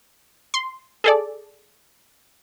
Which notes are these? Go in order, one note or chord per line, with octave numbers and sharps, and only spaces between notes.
C6
G#4 A4 D5